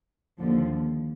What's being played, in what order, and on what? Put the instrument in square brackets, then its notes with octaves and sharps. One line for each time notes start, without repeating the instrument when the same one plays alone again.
[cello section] D#2 D3 F3